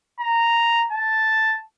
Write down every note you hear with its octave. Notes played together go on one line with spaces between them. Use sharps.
A#5
A5